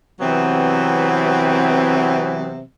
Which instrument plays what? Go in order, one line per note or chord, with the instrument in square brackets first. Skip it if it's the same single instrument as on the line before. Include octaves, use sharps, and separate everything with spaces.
[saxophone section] C3 E3 F#3 B3 C4